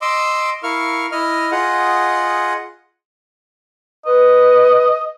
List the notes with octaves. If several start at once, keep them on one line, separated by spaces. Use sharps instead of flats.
D#5 C6 D6 E6
E4 A#4 F5 C#6 F6
E4 D#5 F6
F4 G#4 D#5 F#5
B4 D#5